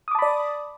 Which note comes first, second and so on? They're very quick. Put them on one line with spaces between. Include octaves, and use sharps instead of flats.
D#6 D6 A5 B5 D5